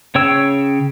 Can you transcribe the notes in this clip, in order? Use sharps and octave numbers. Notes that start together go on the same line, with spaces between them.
C#3 C#5 G5 E6